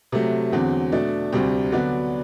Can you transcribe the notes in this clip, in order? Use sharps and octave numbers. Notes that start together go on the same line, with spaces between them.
C3 F#3 A3
E2 D3 F#3 C4
B2 A3 D4
D2 C3 G3 C4
D3 F#3 B3 D4